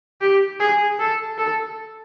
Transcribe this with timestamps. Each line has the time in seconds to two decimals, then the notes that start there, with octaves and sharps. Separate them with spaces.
0.21 G4
0.60 G#4
0.99 A4
1.38 A4